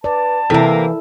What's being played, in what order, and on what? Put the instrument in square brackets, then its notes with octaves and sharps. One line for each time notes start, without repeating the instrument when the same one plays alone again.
[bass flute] B4 [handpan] D5 [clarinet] A5
[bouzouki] C3 A#3 [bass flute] E3 [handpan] E4 A4 A#4